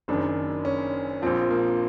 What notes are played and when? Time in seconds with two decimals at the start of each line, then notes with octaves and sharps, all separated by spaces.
0.08 F#1 F#2 D#3 D4
0.65 C#4
1.22 A#1 A#2 F3 C4
1.51 A#3